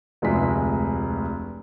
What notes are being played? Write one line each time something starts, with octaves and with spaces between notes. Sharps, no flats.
F1 D2 G#3 B6